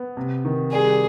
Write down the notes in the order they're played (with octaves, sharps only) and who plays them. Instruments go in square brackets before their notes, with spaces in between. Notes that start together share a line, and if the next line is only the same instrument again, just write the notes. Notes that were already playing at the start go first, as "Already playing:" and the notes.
Already playing: [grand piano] B3
C3
D#3
[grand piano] G3 [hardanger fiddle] G#4